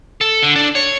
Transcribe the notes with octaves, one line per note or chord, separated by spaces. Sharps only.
A4
D3
D4
C#5